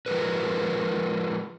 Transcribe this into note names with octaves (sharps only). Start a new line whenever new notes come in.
F3 G#3 G4 G#4 A#4 B4